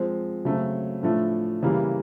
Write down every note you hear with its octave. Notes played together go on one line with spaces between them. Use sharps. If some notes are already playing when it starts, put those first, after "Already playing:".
Already playing: F3 G#3 C4
C#3 F#3 A3 C4
A2 F3 A3 D4 F4
C#3 E3 G3 A#3